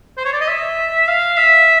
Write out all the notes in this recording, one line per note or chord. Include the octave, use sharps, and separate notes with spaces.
C5
C#5
D5
D#5
E5
F5
E5